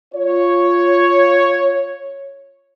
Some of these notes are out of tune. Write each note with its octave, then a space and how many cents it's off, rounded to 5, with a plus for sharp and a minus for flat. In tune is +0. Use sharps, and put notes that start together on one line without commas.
F4 +0 C#5 +0